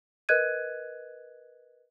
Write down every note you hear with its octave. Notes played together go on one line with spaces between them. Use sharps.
A#4 B4 D#5 F#6 G#6 D#7